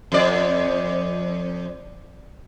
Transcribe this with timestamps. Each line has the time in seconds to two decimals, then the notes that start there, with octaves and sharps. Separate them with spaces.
0.12 F2 D5